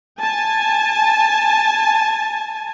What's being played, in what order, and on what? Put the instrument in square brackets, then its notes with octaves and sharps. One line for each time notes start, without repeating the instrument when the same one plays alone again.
[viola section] G#5 A5